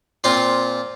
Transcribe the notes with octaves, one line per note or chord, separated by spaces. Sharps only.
A#2 C4 F4